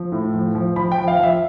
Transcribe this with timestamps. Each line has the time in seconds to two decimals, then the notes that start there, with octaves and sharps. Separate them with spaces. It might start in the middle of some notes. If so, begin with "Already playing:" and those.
Already playing: F3
0.12 A2
0.34 F3
0.55 F3
0.76 F3 B5
0.91 G5
0.97 F3
1.08 F5
1.19 F3 E5